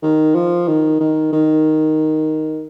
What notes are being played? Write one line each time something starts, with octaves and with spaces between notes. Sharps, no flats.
D#3
F3
D#3
D#3
D#3